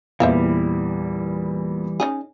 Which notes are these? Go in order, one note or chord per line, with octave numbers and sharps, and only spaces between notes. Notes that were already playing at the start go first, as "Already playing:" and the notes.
E2 A#2 E3 G3 C5 E5 F5
C#4 D#4 G#4